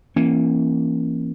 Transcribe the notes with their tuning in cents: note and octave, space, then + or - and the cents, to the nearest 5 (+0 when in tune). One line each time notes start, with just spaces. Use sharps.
E3 +15 A#3 -5 C#4 -35